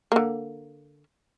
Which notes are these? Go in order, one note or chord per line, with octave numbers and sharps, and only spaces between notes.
D3 A#3